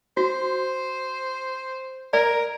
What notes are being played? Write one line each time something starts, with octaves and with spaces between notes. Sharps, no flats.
F#4 C5
A#4 D5